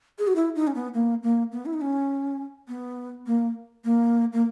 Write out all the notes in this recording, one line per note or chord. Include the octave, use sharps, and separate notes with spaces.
G#4
F#4
E4
D#4
C#4
B3
A#3
A#3
B3
E4
D#4
C#4
B3
A#3
A#3
A#3